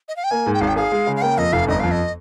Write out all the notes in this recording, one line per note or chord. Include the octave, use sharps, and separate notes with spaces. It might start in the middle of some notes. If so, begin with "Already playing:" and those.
D#5
F5
G5
A#3 G#5
G#2
G5
G#1 F5
G5
G#4 F5
G#3
C#3
F5
A#3 G5
F2 D#5
F1 F5
G1 D#5
F2 F5
D#5